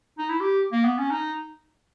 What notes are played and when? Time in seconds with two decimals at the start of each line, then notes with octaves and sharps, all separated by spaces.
0.18 D#4
0.29 E4
0.40 G4
0.72 A#3
0.85 B3
0.98 C#4
1.11 D#4